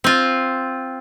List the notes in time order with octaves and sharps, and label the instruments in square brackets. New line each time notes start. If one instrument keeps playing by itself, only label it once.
[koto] C4 F4